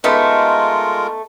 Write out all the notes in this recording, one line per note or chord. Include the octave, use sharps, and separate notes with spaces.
G#3 A3 B3 D#4 F4 A#4